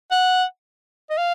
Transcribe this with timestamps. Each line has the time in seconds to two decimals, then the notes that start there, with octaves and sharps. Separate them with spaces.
0.11 F#5
1.10 D#5
1.18 F5